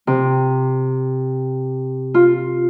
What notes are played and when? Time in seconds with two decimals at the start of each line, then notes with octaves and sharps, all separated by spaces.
0.07 C3
2.14 F4